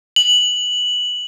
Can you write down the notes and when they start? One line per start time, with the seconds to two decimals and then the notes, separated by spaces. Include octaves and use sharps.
0.16 F#7